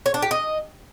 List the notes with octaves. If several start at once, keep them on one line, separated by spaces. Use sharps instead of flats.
C#5
D4
G4
D#5